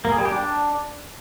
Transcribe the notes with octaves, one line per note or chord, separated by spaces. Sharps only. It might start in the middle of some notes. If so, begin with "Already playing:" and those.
A#3
G#4
G3
G4
D4